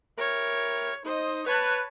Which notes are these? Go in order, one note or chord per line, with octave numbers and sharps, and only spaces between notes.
E4 G4 A#4 C#5
D#4 C5 D#5
B4 C#5 A5